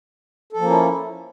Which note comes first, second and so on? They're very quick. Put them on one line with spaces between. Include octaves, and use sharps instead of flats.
A4 F3 A#3 C#4 E4